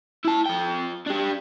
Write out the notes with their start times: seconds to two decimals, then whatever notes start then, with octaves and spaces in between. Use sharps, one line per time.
0.25 E4 A5
0.46 F3 G5
1.06 D4 G4